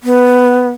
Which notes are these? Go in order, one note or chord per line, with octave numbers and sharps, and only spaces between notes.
B3